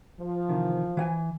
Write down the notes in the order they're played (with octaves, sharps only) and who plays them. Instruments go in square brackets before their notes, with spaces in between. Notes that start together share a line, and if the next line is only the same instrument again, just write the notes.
[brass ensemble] F3
[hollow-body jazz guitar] C3 D#3 E3
E3 F#5 G#5